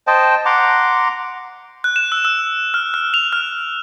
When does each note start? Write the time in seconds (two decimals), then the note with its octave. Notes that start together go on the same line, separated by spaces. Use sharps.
0.07 C5 D#5 G5 A5
0.45 F#5 A#5 C6 D6
1.84 F#6
1.96 E7
2.12 E6
2.25 E6
2.74 F6
2.94 F6
3.14 F7
3.33 F6